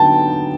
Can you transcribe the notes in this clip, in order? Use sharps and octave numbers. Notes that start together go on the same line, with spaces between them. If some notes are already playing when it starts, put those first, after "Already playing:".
Already playing: D3 F#3 B3 D#4 G5 A5